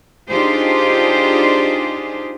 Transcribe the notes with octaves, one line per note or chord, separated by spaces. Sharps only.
D4 D#4 F4 G4 G#4 C5